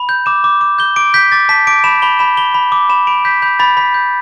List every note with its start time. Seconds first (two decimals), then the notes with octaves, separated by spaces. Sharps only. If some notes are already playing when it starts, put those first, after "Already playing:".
Already playing: B5
0.09 G6
0.26 D6 E7
0.44 D6
0.61 D6
0.79 G6 G7
0.96 D6 D7
1.14 G6 B6
1.32 D6 A6
1.49 A5 B6
1.67 D6 D7
1.84 B5 E7
2.02 B5 G7
2.19 B5 E7
2.37 B5 G7
2.54 B5
2.72 D6
2.89 B5 E7
3.07 B5 D7
3.25 G6 B6
3.42 B5 G6
3.59 B5 A6
3.77 B5 B6
3.94 G6